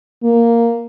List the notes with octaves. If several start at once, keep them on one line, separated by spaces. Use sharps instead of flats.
A#3